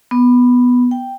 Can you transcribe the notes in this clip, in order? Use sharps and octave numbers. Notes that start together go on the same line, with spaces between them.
B3
G5